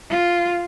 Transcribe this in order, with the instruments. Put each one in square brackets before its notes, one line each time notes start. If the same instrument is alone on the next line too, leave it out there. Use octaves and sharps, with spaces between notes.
[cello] F4